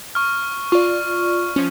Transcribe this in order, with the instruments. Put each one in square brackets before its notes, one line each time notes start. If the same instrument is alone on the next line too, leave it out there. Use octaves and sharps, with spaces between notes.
[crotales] C#6 F6
[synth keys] F4 D5 [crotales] C#6
[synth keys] F3 C#4